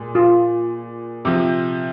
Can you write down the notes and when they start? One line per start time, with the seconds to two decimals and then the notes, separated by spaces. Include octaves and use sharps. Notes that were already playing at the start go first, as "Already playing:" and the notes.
Already playing: A#2 G#3
0.15 F4
1.25 C3 F3